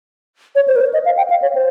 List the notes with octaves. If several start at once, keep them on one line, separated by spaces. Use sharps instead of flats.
C#5
C5
A#4
C5
D#5
F5
G5
F5
C#5
C5